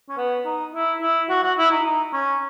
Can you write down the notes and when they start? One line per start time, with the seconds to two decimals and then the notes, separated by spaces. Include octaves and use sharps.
0.09 C#4
0.17 B3
0.45 D#4
0.74 E4
1.02 E4
1.29 F#4
1.43 F#4
1.58 E4
1.71 D#4
1.86 D#4
2.13 C#4